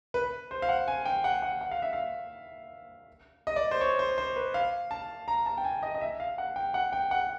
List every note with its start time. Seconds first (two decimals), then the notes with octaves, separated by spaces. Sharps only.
0.14 B4
0.51 C5
0.62 F5
0.69 F#5
0.88 G#5
1.05 G5
1.24 F#5
1.42 F#5
1.61 F#5
1.71 F5
1.82 E5
1.93 F5
3.47 D#5
3.56 D5
3.71 C5
3.81 C#5
3.99 C5
4.18 C5
4.36 B4
4.54 F5
4.91 A5
5.28 A#5
5.46 A5
5.58 G5
5.64 G#5
5.83 D#5
5.95 D#5
6.01 E5
6.20 F5
6.38 F#5
6.56 G5
6.74 F#5
6.93 G5
7.11 F#5